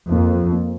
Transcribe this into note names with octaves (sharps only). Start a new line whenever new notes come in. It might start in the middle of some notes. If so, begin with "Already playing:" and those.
F2 A#3
F3
A#3